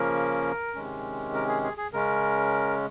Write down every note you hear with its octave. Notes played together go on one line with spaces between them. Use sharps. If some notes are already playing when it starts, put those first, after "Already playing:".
Already playing: C#3 F3 A#3 C#4 A#4
C3 D#3 G#3 C#4
A#4
G#4
G#4
G#4
C#3 G#3 C#4 A#4